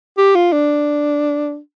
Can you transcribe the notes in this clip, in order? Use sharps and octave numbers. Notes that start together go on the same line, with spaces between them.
G4
F4
D4